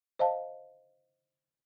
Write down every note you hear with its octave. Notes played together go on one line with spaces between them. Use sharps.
C5 D#5 F5 A5